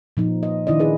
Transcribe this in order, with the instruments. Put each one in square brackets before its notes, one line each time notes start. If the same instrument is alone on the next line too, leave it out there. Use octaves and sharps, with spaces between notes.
[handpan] A#2 F3 D#4
D#5
D#3 D4 E4 D5 D#5
E4 G#4 B4